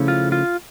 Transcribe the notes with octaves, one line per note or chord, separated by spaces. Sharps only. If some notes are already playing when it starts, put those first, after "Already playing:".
Already playing: C#3 F3 A3 C#4 E4
F4
F4